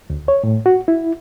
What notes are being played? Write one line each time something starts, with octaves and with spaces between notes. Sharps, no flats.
D2
C#5
A2
F#4
E4